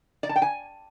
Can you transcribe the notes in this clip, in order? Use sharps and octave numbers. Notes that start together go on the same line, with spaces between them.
D5
A5
G5
G#5